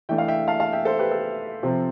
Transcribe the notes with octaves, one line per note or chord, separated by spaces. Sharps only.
E3 A3 D4 E5 G5
F5
E5 G5
F5 A5
F5 A5
E5 G5
A4 C5
G4 B4
A4
C3 F3 C4